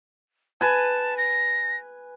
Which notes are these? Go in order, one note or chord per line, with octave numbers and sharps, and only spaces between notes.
B4 G#5 A5
A#6